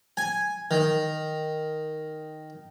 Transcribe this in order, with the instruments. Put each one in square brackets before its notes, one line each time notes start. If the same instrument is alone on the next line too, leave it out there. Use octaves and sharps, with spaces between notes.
[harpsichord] G#5
D#3